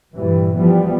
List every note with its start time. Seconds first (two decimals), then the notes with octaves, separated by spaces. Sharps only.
0.14 G2 A#2 E3 G3
0.55 E3 F3 G3 B3